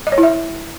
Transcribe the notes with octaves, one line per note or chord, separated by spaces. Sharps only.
D#5
C#5
E4
E5